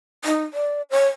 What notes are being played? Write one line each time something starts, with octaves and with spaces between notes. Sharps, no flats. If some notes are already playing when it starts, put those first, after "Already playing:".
D#4
D5
C#5